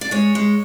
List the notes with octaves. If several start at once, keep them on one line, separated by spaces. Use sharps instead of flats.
D5
G#3 C#5
G#3